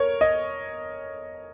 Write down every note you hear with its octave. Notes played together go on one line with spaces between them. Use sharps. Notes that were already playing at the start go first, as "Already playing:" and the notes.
Already playing: A#4 C#5
D#5